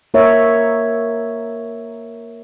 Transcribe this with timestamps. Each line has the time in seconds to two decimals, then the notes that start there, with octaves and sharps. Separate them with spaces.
0.14 A#3 A#4 C#5 E5